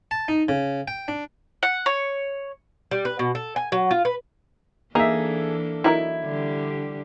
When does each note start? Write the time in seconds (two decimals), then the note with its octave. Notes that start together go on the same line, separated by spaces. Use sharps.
0.11 A5
0.28 D#4
0.49 C#3
0.88 G5
1.08 D4
1.63 F#5
1.86 C#5
2.91 G3
3.05 B4
3.19 B2
3.35 A4
3.56 G#5
3.72 F#3
3.91 F4
4.05 B4
4.95 E3 A#3 D4 D#4 G#4 A4 E5
5.84 F#3 D#4 E4 A#4
6.26 D3 G3 G4